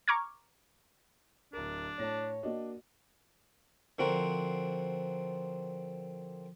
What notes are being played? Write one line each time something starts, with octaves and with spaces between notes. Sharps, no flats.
A#5 C#6 D6 F6 G#6
D1 D4 A#4
A2 C#5 A5 A#6
A#3 D4 F#4 D#5
D3 F3 C4 F#4 A#4